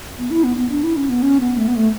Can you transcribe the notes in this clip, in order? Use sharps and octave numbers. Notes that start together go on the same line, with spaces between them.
B3
E4
B3
B3
D4
E4
C#4
B3
C#4
B3
A3
B3
A3